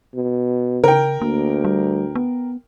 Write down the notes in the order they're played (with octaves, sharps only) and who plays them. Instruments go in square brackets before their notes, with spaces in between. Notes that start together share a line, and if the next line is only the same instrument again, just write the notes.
[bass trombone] B2
[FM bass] C#3 [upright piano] A#4 G5
[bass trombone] D2 [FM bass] A#3
[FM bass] G3
B3